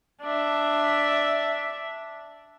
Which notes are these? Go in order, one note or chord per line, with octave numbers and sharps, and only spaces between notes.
D4 E5